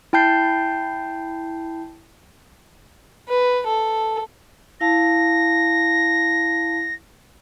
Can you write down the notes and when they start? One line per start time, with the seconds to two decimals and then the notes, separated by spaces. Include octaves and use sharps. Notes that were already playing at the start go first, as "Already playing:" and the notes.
0.13 E4 G5 A5 G6 C7
3.29 B4
3.67 A4
4.81 E4 F5 A5 A#6